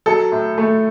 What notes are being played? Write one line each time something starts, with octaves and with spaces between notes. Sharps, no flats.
F#3 A4
A2
A3